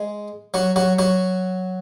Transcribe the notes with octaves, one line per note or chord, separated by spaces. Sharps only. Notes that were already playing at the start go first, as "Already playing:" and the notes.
Already playing: G#3 G#4
F#3 F#4
F#3 F#4
F#3 F#4